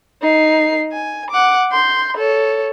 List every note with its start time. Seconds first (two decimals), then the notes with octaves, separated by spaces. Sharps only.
0.22 D#4 C7
0.92 G#5
1.31 F#5 D6
1.72 C6 G6
2.17 A4 C#5